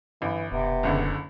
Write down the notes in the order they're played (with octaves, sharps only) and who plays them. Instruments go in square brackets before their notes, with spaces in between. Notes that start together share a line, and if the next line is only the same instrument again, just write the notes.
[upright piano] G1 [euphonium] E3
[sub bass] E1 [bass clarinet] C3 [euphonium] B3
[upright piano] F#1 C#2 D3